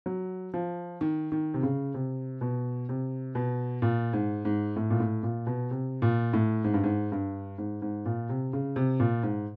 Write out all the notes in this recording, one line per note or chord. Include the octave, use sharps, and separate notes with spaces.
F#3
F3
D#3
D#3
C3
C#3
C3
B2
C3
B2
A#2
G#2
G#2
A2
A#2
A2
A#2
B2
C3
A#2
A2
G#2
G2
G#2
G2
G#2
G#2
A#2
C3
C#3
C3
A#2
G#2